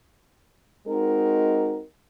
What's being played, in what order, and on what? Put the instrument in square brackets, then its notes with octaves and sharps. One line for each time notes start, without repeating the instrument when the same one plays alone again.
[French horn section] G#3 C4 D#4 F#4 A#4